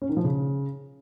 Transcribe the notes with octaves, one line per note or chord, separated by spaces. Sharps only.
C#4
D#3
F3
C#3